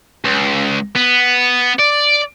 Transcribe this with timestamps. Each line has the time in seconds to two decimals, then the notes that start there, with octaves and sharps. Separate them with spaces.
0.25 C#2
0.96 B3
1.80 D5